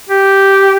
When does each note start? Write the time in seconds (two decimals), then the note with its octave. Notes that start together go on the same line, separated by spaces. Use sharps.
0.09 G4